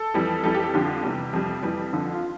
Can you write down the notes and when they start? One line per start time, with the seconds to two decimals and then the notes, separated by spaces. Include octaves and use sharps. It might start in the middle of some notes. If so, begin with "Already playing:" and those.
Already playing: A4
0.14 F2 E3 G3
0.44 F2 E3 G3 A4
0.55 G4
0.64 A4
0.74 F2 D3 F3 G4
1.03 E2 C3 E3 G3
1.33 F2 C3 G3
1.63 F2 E3 G3
1.93 F2 D3 F3 A4
2.13 F4